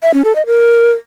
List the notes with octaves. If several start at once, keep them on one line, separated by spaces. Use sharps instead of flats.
E5
C#4
A4
D#5
A#4